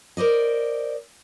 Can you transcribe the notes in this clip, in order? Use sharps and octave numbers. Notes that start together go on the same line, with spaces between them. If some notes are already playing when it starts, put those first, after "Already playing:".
A#4 C5 D5 D#5